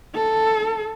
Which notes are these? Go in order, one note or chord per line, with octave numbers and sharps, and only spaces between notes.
A4